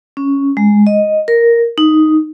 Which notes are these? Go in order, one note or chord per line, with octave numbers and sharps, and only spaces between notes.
C#4
G#3
D#5
A#4
D#4